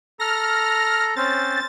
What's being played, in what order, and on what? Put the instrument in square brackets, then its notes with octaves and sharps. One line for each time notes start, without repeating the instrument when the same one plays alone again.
[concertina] A4 A#5 [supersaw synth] F6 A#6
[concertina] C4 C#4 C5 [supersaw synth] A6